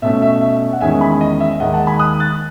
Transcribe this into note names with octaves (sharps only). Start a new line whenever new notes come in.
B2 A3 C#4 E5
E5
E5
F#5
E2 D#3 G#3 C#4 E5 G#5
G#5 B5
D#5
E5
D#2 D#3 G#3 D#5 F#5
F#5 A5
G#5 B5
D#6 F#6
F#6 A6